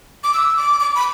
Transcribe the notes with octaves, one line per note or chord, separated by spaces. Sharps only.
D6
E6
D6
D6
B5